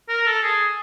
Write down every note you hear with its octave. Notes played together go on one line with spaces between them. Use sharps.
A#4
A4
G#4